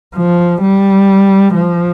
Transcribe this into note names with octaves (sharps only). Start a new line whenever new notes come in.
F3
G3
F3